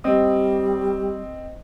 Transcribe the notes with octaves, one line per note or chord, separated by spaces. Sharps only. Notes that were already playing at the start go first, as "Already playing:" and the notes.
G3 C4 D#5 D#6